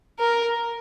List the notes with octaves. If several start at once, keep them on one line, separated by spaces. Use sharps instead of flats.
A#4